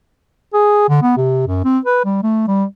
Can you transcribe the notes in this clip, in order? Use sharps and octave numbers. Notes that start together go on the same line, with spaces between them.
G#4
D3
B3
C3
F#2
C4
B4
G3
A3
G3